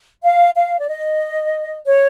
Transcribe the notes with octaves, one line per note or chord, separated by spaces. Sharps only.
F5
F5
D5
D#5
C#5